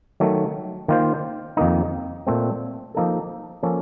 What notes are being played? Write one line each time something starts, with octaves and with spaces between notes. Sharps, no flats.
D#3 F#3 A3
D#3 A#3 F4 C5
F2 D#3 A#3 D#4
A#2 A3 C4
F3 A#3 D#4 A4
F3 A#3 C#4 A4